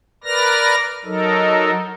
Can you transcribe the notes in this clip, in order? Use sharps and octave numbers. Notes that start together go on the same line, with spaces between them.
A#4 B4 D5 F6 A#6
F#3 D#4 A4 A#4